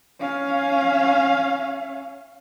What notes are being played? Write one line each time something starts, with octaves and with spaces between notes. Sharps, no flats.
C#4 F5